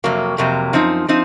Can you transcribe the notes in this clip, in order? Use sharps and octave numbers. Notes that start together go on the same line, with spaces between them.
F2 C3 F#3 A#3
F2 C3 F#3 A#3
F#2 F3 C4 D#4
F3 C4 D#4